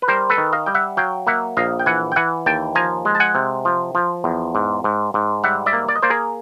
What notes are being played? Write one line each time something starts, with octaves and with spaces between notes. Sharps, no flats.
B4
G3 A#4 C5
A4 B4
D#3
D#5 F5
G3 G5
E5 F#5
F#3 F5 G5
A#3 E5 F#5
A#1 D#5 F5
G5
E3 F#5 G#5
G5
E3 F#5 G#5
D#2 G5 A5
F3 G#5 A#5
G#3
A5
F#5 G#5
C3
F3
F3
E2
G#2
G#2
G#2
G3 E5 F#5
D5 E5
A#3
D5
D#5
A#3 C5 D5
G#4 A#4